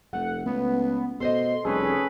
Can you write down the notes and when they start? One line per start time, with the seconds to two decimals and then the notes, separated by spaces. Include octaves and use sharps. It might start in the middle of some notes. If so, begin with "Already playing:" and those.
0.13 F1 A3 F#5
0.46 C#2 B3
1.20 B2 A4 C5 D#5 C6
1.65 F1 G3 C#4 G#4 A4 B4